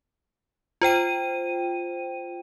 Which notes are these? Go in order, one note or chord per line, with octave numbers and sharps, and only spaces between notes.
F4 C5 G5 D#7